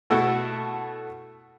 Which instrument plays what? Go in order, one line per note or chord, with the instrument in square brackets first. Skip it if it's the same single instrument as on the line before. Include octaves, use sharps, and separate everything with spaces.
[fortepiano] B2 A3 E4 F#4 A4